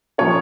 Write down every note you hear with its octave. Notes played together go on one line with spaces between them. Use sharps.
F3 A#3 C#4 C#5